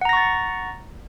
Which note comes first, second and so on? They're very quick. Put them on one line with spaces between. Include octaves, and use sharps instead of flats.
F#5 A#5 A#6 C#6 A6